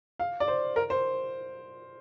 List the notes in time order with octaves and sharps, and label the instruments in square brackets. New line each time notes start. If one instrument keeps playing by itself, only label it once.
[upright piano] F5
D5
C5
A#4
C5